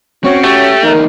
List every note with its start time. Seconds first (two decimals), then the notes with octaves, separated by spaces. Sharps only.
0.24 C4 C#4 F#4 C#5
0.44 A3 G4
0.83 E2 D#4 A#4